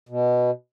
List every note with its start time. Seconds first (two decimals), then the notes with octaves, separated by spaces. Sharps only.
0.09 B2